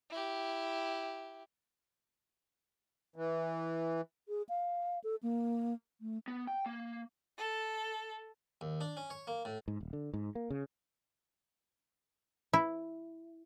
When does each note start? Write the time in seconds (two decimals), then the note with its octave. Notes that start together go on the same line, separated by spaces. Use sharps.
0.10 E4 G4
3.16 E3
4.29 G#4
4.49 F5
5.04 A4
5.23 A#3
6.01 A3
6.28 B3
6.47 G5
6.66 A#3
7.37 A4
8.61 D#2
8.81 D4
8.97 C#4
9.10 C#5
9.27 A#3
9.45 A2
9.68 G#2
9.81 D#1
9.93 D3
10.13 G#2
10.35 A#3
10.50 C#3
12.53 E4